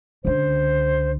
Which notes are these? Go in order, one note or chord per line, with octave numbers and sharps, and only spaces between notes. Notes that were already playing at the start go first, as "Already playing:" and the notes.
C#2 D3 C5